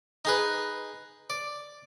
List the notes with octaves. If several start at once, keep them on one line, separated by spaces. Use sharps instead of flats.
D#4 G#4 B4
D5